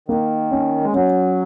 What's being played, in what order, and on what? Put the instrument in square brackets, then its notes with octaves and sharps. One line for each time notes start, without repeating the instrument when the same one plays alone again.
[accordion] D#3 [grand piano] A#3
[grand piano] C#4
[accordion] G#3
[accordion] F#3 [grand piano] C#4